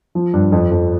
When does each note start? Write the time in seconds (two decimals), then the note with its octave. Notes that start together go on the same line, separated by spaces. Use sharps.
0.15 F3
0.34 G2
0.52 F2
0.71 F2